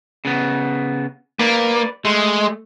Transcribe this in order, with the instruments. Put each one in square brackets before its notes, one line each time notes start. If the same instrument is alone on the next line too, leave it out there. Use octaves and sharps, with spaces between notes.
[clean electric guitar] C#3 B3
[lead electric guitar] A#3 [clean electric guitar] B4 D5
[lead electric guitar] G#3 [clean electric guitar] A3